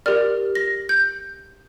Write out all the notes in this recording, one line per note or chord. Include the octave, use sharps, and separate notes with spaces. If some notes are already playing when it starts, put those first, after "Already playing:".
G4 A#4 D5 F6
A#6
G6